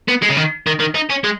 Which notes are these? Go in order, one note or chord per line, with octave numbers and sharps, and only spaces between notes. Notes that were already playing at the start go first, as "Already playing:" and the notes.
B3
G#3
C#3
D#3
D#3
D#3
D#4
C#4
G#3